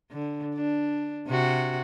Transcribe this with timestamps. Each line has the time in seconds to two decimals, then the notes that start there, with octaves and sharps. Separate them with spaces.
0.12 D3
0.55 D4
1.27 C3 F#4